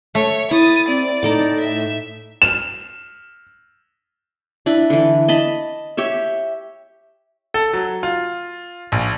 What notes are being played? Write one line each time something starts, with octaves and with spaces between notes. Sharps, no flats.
A3 C#5
E4 D#6 A6
C4 D5
A2 D#4 A4 D6
E5
E7
D4 E4 B4
D3 E3
D#5 A5 B5
G4 C#5 E5
A4
F#3
F4
A#1